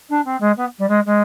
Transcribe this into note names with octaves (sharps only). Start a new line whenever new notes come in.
D4
C4
G#3
B3
G3
G#3
G#3